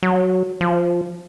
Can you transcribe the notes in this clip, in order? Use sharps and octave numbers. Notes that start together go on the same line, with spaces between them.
F#3
F3